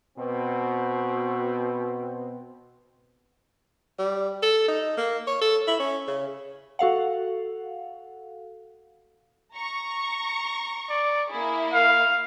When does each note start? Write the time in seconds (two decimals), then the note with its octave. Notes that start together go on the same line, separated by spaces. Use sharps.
0.17 B2 C4
3.99 G3
4.43 A4
4.68 D#4
4.98 A#3
5.28 C#5
5.42 A4
5.68 E4
5.80 C#4
6.08 C#3
6.79 F#4 A4 F5 F#5
9.55 A#5 C#6
10.89 D5
11.30 A#3 E4 G#4
11.73 F5